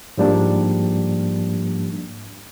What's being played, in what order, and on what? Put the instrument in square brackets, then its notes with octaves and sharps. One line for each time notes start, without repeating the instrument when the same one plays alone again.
[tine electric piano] G#2 F3 G3 A#3 D4